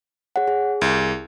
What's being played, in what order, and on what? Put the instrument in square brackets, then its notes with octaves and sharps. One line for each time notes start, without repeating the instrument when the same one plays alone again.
[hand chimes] G#4 C#5 F#5
G#4
[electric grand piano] C2